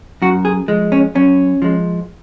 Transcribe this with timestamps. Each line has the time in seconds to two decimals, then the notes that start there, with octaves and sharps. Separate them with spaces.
0.22 F#2 F#4
0.45 G#4
0.68 F3 G#3
0.92 C#4
1.15 F#2 C#4
1.62 F3 G#3